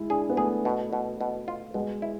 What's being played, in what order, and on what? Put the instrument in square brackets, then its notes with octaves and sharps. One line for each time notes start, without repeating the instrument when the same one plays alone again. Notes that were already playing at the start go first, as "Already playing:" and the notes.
Already playing: [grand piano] G#3 E4
[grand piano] D4 [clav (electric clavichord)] G#4
[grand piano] B3
[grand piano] A3 [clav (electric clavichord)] G#4
[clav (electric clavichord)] B2
B2
B2
F4
[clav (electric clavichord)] B2 [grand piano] G#3
[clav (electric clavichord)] E4